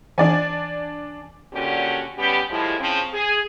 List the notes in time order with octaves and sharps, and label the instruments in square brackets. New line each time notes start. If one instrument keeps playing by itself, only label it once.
[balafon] E3 [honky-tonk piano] D4 D5 G#5
[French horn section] A#2 D3 C#4 F#4 G4
G3 B3 C#4 G4
A2 F3 G3 G#3 E4
C#3 F3 C4
G#4